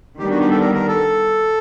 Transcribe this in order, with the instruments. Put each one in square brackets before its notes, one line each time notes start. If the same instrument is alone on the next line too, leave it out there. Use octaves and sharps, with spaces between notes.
[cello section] D#3 G3 B3 D4 [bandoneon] G4
[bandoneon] F#4
G4
A4
A#4
A#4
A4